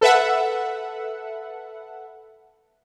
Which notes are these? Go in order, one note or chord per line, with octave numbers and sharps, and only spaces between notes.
A4 B4 E5 F#5